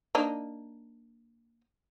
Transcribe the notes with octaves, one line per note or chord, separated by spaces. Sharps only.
A#3 D4 D#4